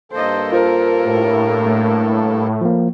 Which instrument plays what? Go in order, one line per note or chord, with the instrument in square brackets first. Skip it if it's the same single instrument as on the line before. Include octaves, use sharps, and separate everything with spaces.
[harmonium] G2 A#3 A4 [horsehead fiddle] C5 D#5
[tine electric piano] F4 C5 [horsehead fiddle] A#4
[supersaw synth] A2
[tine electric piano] A3
F3 A#3